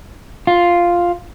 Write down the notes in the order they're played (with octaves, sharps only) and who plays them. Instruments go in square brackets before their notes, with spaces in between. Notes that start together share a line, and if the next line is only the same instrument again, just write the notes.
[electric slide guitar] F4